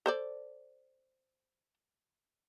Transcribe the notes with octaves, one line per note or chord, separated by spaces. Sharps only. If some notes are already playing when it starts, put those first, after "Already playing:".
A4 C5 D5